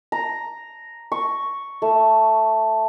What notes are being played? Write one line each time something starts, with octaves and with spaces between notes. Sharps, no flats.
A#5
C#6
A3